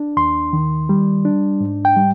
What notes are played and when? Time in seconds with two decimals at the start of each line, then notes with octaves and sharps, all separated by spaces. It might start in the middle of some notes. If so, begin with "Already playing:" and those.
Already playing: D4
0.17 D#2 C6
0.53 D#3
0.89 G3
1.25 D4
1.61 G#2
1.85 G5
1.96 G3